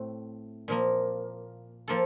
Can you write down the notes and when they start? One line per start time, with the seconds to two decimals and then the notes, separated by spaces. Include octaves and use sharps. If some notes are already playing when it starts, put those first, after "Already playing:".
Already playing: A2 A3 C4
0.68 A#2 F3 A#3
1.88 F3 A#3 F4 A4